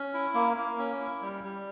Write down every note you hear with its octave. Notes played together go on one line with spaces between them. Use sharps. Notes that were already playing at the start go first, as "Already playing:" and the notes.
Already playing: C#4
E4
A#3
A#3
C#4
E4
G3
G3